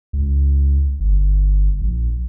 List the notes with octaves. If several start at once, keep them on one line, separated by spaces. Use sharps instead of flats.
C#2
G1
A#1